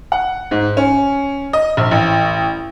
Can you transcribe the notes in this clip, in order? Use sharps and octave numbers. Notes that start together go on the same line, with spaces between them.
F#5
G#2
C#4
D#5
A#1
A1